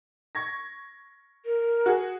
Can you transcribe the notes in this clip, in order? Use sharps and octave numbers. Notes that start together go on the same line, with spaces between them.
C#6 G#6 A#6
A#4
F#4 G#4